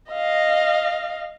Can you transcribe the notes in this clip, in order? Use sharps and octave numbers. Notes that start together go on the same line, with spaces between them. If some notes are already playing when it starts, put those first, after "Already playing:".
D#5 F5